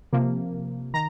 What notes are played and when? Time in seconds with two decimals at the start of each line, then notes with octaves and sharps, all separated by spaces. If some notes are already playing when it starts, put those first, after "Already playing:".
0.12 C3 F3 A#3
0.94 D#3 A#5